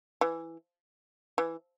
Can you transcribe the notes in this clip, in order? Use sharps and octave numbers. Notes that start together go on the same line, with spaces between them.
E3
E3